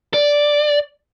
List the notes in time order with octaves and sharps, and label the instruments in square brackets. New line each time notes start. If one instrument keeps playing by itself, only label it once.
[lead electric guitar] D5